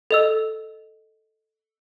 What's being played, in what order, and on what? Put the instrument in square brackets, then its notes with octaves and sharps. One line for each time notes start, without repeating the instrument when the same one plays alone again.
[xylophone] A4 D#5 E6